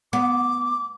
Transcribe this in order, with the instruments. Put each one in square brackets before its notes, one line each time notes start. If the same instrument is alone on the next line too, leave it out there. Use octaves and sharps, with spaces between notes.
[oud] B3 [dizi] D6